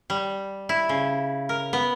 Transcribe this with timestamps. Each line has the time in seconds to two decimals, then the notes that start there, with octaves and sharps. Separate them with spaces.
0.10 G3
0.69 E4
0.89 C#3
1.49 A#4
1.73 B3